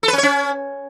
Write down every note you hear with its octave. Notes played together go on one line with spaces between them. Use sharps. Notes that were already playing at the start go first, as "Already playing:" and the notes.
A4
B4
C#4
C#5
C#4